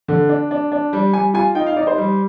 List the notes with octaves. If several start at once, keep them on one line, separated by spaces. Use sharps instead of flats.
D3
D4
D4
D4
G3
G3 G#5
F4 G#5
D#4 G5
F5
D#4 D5
C5
G3